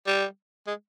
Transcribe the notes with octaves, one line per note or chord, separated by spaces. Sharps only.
G3
G#3